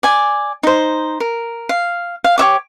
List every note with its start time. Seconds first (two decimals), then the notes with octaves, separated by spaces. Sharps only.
0.03 D5 G#5
0.63 D#4 C5
1.20 A#4
1.69 F5
2.24 F5
2.38 G4 C#5 E5 D6